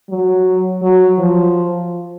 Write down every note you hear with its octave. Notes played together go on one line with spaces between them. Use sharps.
F#3
F#3
F3